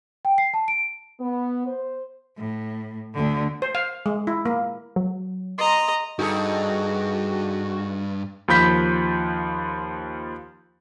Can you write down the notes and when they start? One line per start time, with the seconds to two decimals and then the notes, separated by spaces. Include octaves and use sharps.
0.25 G5
0.38 C7
0.54 A5
0.68 D7
1.20 B3
1.67 C5
2.37 A2
3.14 D2 D3
3.62 C5
3.75 F5
4.06 G#3
4.27 E4
4.46 A#3
4.96 F#3
5.58 D#5 A#5 C6
6.19 G2 D#4 F#4 G#4 A4
8.48 D#2 F3 B5 G6 B6